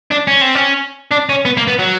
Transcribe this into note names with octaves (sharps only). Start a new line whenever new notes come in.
D4
C#4
C4
C#4
D4
C#4
B3
A#3
B3
F#3